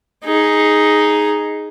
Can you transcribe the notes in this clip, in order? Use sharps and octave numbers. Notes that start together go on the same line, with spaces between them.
D#4 G#4